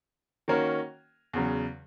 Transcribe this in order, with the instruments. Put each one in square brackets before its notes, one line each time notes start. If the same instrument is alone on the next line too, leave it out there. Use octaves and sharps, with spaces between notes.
[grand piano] D#3 A#3 C#4 F#4 A#4
E2 C#3 F#3